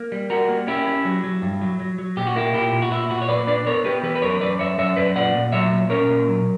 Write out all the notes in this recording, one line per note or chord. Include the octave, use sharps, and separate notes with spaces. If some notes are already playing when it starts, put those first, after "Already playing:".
Already playing: A#3
G3
G3 F#4 A#4
A#3
C#4 E4 G4
C#4
F#3
F#3
G2
F#3
F#3
F#3
A#2 G4
F#4
A#3 E4 G4
A#2 E4 G4
A#2
F#4
A#2 E4
A#2 F#4
C#5
A#2 B4 D5
D4 B4 D5
B3 A#4 C#5
B3 G4 B4
E3 G4 B4
B4
F#2 A#4 C#5
F#2 B4 D5
F#2 C#5 E5
F#2 C#5 E5
F#2 B4 D5
A#2 D5 F#5
A#2
F#3 C#5 E5
A#2
C#4 A#4 C#5
A#2
F#3